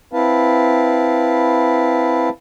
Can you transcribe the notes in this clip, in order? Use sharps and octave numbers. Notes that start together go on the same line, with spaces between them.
C4 E4 B4 F5 A5